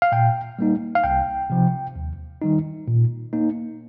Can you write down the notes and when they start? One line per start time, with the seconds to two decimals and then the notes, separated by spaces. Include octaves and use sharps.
0.02 F5
0.12 A#2 G5
0.59 G3 A#3 D#4
0.95 F5
1.04 C2 G5
1.50 C3 F3
1.96 D#2
2.42 D#3 G3 D#4
2.88 A#2
3.33 A#3 D#4